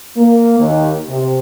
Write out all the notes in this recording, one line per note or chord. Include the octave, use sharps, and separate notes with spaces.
A#3
D#2
C3